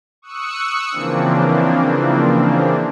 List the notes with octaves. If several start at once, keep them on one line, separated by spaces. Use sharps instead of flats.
C#6 D#6 E6 F#6 C#7
C#3 E3 F3 A#3 C4 D4